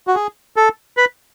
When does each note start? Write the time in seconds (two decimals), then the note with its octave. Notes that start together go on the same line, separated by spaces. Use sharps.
0.07 F#4
0.15 G#4
0.56 A4
0.97 B4